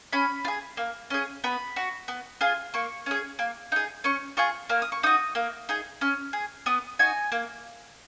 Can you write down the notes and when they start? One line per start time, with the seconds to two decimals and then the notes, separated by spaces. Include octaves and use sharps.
0.12 C#4 B5
0.45 F4
0.48 G#4
0.77 A#3
1.10 C#4 G#4
1.44 B3 B5
1.76 F#4
2.08 B3
2.41 F4 G#4
2.74 A#3 C#6
3.06 C#4 G#4
3.39 A#3
3.72 D#4 G#4
4.04 C#4 C#6
4.37 F4 G#4 C#6
4.69 A#3 F6
4.82 D#6
4.92 C#6
5.03 D#4 F#4 D#6
5.35 A#3
5.69 D#4 G#4
6.01 C#4 F6
6.33 G#4
6.66 B3 D#6
6.99 D#4 F#4 G#5
7.32 A#3